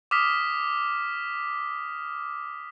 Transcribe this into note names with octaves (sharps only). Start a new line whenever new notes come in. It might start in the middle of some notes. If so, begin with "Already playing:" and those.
D6 D#6 F6 B6